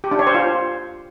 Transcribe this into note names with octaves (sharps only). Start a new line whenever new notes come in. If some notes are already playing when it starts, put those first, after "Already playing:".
G4
D4
C#5
C5
F4